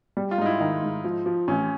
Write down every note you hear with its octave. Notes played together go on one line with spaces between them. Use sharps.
G3
F4
G#2 D#4
E4
D#3 D#4
G#2
F3
F3
A1 C#4